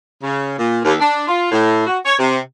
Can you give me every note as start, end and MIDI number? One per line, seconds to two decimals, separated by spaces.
0.22 0.57 49
0.57 0.80 46
0.85 0.94 39
0.99 1.23 62
1.27 1.50 65
1.51 1.84 45
1.86 1.98 66
2.05 2.14 73
2.19 2.38 48